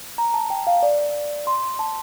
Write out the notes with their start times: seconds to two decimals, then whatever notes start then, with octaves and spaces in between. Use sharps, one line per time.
0.18 A#5
0.34 A5
0.50 G5
0.67 F5
0.83 D5
1.47 C6
1.79 A5